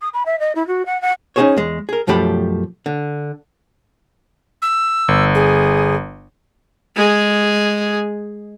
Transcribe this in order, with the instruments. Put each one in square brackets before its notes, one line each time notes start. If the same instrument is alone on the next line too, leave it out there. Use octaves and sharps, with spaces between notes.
[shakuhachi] D#6
B5
E5
D#5
E4
F#4
F#5
F#5
[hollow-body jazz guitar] C#4 D#4 E4 G#4 C5 C#5
E2 G#3
G#4 A#4
B1 F#2 F3 A3 G4 B5
D3
[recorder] E6
[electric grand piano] G1
[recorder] G#4
[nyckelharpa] G#3 G#4